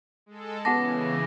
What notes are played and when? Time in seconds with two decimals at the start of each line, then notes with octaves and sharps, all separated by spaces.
0.26 G#3 A4
0.65 C#3 E3 B3 G4 F#5 A5 D6 A#6